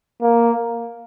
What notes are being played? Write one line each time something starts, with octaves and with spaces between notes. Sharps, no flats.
A#3